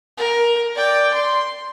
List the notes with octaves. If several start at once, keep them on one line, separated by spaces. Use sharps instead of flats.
A#4
D5 G5
C6